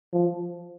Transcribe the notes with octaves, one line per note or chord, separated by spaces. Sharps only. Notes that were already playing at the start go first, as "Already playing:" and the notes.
F3